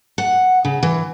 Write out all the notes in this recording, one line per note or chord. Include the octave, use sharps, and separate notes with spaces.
F#5
C#3
E3